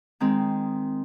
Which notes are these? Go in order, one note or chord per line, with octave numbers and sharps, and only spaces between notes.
D#3 G#3 C4